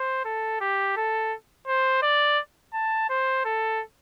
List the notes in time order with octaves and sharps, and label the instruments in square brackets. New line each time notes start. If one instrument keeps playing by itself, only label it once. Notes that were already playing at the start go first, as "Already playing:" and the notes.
Already playing: [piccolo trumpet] C5
A4
G4
A4
C5
D5
A5
C5
A4